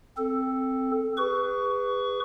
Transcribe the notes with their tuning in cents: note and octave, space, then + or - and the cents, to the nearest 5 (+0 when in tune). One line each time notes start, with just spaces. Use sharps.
C4 +0 A4 +0
G#4 -30 B4 +10 C#6 +20